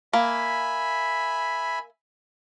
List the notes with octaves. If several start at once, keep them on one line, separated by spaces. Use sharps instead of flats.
A#3 E5 G#5 B5